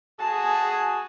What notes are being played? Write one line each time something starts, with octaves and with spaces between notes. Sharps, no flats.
F#4 G#4 A5